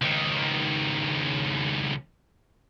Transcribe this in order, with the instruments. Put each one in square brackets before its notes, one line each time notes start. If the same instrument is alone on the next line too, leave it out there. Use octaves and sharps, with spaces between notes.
[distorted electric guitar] C#2 D#3